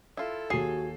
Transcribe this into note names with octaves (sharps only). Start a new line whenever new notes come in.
E4 F4 A4
D#2 F#4 G#4 C7